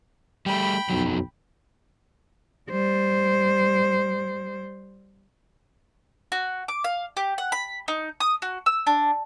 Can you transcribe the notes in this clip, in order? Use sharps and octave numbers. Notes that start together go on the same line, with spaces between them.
G3 A3 G5 B5
B1 F2 F#3
G3 C5
F#4
D6
F5
G4
F#5
B5
D#4
D#6
F#4
E6
D4